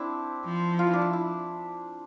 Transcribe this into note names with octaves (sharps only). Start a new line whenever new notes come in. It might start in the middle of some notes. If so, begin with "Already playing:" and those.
Already playing: C4 D4 E4
F3
F4
E4
D4
E4
E4